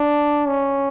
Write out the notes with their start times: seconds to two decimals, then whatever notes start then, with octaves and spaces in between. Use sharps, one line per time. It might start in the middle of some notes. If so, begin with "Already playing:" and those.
Already playing: D4
0.48 C#4